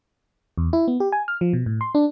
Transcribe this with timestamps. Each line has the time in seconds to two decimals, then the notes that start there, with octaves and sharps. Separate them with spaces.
0.58 E2
0.73 E4
0.88 B3
1.00 G4
1.12 G#5
1.28 F6
1.41 F3
1.53 B2
1.66 A2
1.81 C6
1.95 D4